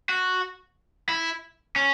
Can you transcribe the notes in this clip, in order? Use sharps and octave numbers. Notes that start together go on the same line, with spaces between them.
F#4
E4
C#4